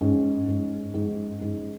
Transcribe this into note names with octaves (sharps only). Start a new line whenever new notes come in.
G#2 C#4
G#2
G#2
G#2